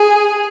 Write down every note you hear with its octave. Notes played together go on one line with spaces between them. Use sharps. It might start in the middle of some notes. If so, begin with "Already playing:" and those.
Already playing: G#4